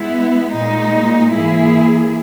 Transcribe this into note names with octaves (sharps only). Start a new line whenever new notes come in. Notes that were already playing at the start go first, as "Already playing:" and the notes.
Already playing: G#3 B3 E4
A#2 G#3 D#4
G#2 E3 A#3 E4 G#4